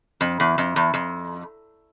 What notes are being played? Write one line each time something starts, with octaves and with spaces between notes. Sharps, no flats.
F2
E2
F2
E2
F2